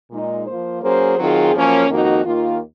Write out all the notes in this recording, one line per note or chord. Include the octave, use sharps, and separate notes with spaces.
A#2 G#3 D#4
F3 A#3 F4 C5
F#3 A#3 C#4 G#4 C5
D#3 F#3 C4 F4 G#4
F#2 F3 A#3 C#4
F2 D#3 A#3 D#4 F#4
D#2 D#3 A#3 F4